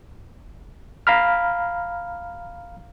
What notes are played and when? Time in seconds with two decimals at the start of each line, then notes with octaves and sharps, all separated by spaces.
1.07 F5 A#5 B5 F6